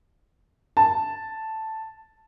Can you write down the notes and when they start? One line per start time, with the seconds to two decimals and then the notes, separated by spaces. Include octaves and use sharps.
0.77 A5